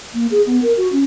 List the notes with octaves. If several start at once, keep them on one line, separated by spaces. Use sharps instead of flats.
A#3
G#4
B3
A#4
F#4
C#4